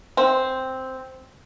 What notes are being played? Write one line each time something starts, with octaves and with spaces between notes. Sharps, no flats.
C4